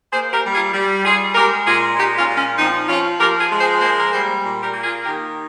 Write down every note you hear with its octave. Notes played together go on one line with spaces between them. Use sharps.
A#3 G#4 C5
G4 A#4
G3
F4 G#4
G3
G3 F4 G#4
G#3 G4 A#4
A#2 F4 G#4
G#3 D#4 G4
C#4 F4
A#2
C#4
F3 C4 D#4
F3 C#4 F4
F3 G4 A#4
F4 G#4
G#3
G#4 C5
A#3 G#4 C5
A#4
G3 G#4 C5
A#2
G4 A#4
A#3
F4 G#4
D#3 G4 A#4